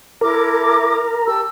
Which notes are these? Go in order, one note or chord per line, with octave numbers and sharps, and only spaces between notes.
E4 A4 A#4 D6
G4 A5 E6